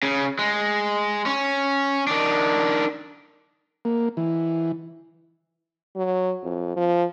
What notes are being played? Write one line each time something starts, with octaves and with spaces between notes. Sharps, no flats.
C#3
G#3
C#4
D#3 D4
A#3
E3
F#3
F2
F3